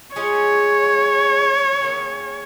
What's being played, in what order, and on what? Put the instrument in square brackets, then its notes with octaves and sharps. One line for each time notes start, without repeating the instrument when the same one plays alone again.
[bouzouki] G#3 C#4 F4 G#4 [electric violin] C#5
[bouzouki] D#3 A#3 C#4 G#4